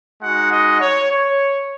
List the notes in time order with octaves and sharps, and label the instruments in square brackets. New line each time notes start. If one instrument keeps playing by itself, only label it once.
[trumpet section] G#3 D#4 F#4 F#5
D#5
C#5
C#5